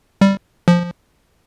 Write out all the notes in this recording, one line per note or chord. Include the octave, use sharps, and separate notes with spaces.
G3
F3